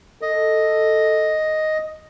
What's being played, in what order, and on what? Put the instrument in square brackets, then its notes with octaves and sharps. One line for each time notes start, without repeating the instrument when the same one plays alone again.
[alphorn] A4 [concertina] D#5